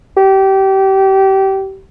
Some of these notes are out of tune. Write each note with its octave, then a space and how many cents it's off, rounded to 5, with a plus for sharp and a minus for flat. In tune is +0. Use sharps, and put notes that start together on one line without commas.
G4 -25